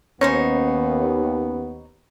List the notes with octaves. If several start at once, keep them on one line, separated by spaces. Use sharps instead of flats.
D#2 B3 C#4 D#4 C5 C#5